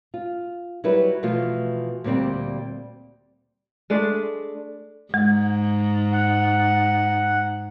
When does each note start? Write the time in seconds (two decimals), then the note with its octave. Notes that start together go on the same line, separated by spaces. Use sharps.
0.14 F4
0.84 F#3 G3 E4 B4
1.23 B2 E3 F3 A3 F4
2.04 D2 A#2 G3 C4 D5 G5
3.90 G#3 A3 D4
5.14 G#2 G#3
6.13 F#5